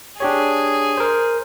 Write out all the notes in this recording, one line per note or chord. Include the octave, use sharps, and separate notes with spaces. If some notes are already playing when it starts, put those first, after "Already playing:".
D4 G4 G#4 C#5
A#4 C5